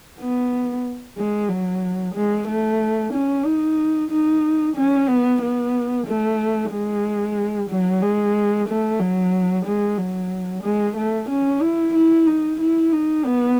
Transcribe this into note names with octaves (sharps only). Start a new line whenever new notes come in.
B3
G#3
F#3
G#3
A3
C#4
D#4
D#4
C#4
B3
B3
A3
G#3
F#3
G#3
A3
F#3
G#3
F#3
G#3
A3
C#4
E4
E4
D#4
E4
D#4
B3